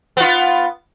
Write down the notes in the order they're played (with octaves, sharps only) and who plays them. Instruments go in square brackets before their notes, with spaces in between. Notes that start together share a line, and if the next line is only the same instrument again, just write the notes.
[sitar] B3 F4